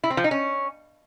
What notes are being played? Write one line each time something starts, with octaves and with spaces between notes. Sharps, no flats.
E4
C4
F3
D#4
C#4